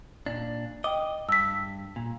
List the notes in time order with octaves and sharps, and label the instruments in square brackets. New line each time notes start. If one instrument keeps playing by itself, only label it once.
[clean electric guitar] A#2 D4
[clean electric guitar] D#5 [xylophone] G5 D6
[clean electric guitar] G2 [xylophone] E6 B6
[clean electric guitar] A#2